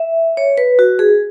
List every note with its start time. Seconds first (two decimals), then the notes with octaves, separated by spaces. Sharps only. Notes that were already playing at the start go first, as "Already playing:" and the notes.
Already playing: E5
0.37 C#5
0.58 B4
0.79 F#4
0.99 G#4